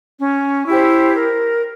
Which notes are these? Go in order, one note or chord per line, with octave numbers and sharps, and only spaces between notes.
C#4
E4 G4 C5
A#4